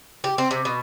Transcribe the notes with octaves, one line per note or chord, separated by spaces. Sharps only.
G4
C4
C3
B2